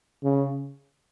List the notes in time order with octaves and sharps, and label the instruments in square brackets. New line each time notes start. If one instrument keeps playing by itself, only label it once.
[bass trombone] C#3